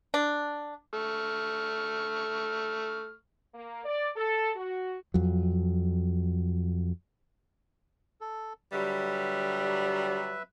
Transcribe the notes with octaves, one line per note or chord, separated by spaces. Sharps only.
D4
A3 C#6 F6
A#3
D5
A4
F#4
F2 F#3
A4
D3 F#3 G3 B4 E5